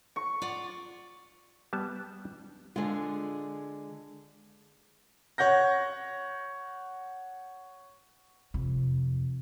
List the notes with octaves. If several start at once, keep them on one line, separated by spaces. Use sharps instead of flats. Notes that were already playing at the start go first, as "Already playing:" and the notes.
C#6
F4 D5 F#5
G3 B3 A5
D3 G#3 F4 G#4
C#5 F#5 G6 A#6
F2 C3